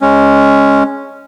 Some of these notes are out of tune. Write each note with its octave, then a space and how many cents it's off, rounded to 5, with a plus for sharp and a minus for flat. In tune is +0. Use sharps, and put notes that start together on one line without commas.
G#3 +0 C#4 +0